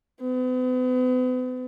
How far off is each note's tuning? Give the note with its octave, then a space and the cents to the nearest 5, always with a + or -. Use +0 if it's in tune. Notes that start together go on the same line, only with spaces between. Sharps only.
B3 +40